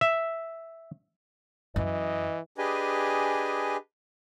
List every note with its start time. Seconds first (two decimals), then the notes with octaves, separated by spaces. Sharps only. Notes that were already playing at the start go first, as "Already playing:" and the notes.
0.01 E5
1.76 F#2 E3 D#5
2.58 D4 G4 G#4 B4 D#5 G#5